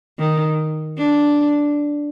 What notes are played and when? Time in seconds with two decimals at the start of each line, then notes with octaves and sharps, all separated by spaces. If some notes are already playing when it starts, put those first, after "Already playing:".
0.19 D#3
0.98 D4